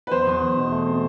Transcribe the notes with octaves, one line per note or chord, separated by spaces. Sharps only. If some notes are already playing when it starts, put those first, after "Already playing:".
B4
E2 C5
E2
E2
B2
A3
C4